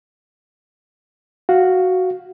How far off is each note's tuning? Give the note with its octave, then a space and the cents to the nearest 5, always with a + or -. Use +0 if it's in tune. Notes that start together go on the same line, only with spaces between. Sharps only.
F#4 +0 F5 +0